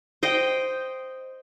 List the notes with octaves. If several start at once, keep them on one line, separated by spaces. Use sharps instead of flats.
C5 D#5 G5